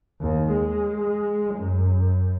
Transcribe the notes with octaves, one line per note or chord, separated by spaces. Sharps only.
D#2
G#3
F#2